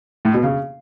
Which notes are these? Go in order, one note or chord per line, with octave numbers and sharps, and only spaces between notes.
A2
B2
C#3